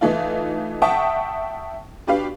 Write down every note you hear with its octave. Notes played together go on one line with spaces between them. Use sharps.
E3 A3 D#4 F4
E5 F#5 G5 A5 C#6 D#6
B2 D4 G4 B4 F5